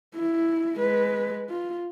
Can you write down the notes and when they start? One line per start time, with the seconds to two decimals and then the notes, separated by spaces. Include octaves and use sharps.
0.16 E4
0.76 G#3 B4
1.50 F4